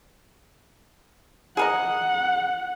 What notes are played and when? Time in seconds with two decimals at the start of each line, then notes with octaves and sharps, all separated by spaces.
1.57 G#4 A#4 D#5 F#5